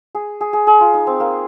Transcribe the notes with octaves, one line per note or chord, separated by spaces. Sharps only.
G#4
G#4
G#4
G#4
F4
D#4
C4
A#3